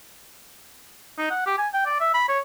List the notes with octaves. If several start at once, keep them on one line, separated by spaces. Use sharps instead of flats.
D#4
F#5
G4
G#5
G5
D5
E5
B5
C#5